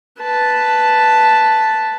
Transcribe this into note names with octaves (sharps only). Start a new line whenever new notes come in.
B4 A5